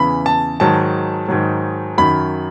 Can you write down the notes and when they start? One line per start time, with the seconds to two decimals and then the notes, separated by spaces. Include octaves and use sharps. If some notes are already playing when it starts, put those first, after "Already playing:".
Already playing: E2 C#3 E3 B5
0.26 A5
0.60 G#2 D#3 F#3 A5
1.28 G#2 D#3 F#3
1.98 F#2 D#3 F#3 B5